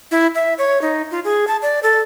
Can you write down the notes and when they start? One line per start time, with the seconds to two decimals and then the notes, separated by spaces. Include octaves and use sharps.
0.11 E4
0.35 E5
0.58 C#5
0.82 D#4
1.11 F4
1.24 G#4
1.47 A5
1.62 D5
1.83 A4